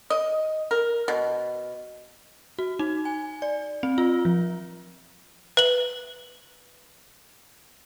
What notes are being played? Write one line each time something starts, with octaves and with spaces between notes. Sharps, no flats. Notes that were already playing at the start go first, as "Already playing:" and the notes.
D#5
A#4
B2
F#4
D#4
G#5
D5
C4
F4
F3
B4 F#7